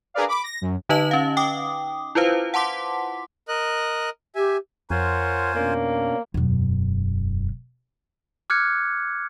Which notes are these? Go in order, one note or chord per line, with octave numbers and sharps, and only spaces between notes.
D4 G#4 A#4 B4 D5 F5
B5 D6
A#6
F#2
D3 D#4 B4 D#5 A5 F#7
C#4 F5
G5 D6 D#6
E4 F4 B4 C5 F5
F#5 A5 C6 D6 B6
A#4 D#5 F#6
G4 E5 G#5
F2 F4 A#4 C5 C#5 F#5 G#5
B2 A#3 C#4 D4
E1 F#2
D6 F6 F#6 G#6 C#7